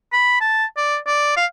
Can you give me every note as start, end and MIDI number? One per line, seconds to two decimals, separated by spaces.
0.13 0.40 83
0.41 0.65 81
0.77 0.97 74
1.06 1.33 74
1.36 1.45 77